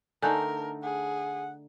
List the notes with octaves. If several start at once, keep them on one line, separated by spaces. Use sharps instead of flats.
D3 A3 D#4 A#4 G#5 F#6 G6
G#4 F#5